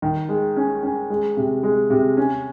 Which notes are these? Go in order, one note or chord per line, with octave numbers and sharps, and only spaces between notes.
D#3
G#3
C#4
C#4
G#3
C3
G#3
C3
C#4